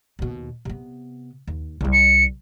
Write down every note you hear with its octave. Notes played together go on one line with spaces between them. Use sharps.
D#2 B2
C3 B3
D#2
C2 G3
C#7